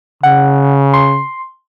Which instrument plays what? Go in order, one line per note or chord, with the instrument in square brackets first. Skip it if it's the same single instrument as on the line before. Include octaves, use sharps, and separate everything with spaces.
[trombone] C#3 [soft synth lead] F#5
[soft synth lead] C6